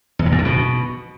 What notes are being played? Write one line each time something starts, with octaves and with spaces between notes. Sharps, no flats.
E2
A2
F#2
D3
B2